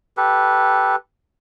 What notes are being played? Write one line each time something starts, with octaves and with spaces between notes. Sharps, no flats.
G4 A4 B4